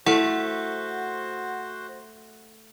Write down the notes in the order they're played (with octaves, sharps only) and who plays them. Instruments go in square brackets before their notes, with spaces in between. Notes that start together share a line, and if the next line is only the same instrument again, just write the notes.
[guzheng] A3 [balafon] E4 A4 [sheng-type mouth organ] F#4 C5 [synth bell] F#5